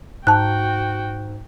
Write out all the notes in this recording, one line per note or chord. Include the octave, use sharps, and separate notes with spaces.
G#2 F#4 G5 A5 F#6